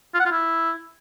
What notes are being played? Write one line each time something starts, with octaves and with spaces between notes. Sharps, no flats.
F4
F#5
F4
E4